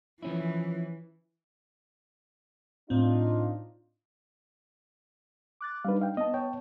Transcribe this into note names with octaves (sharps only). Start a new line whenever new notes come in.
E3 F3 C#4 E4
A2 C4 D4 D#4 F4
D6 F#6 A6
G3 D4 D#4 B4 F5
F5 G5
B3 D#5 A5
C#5 G5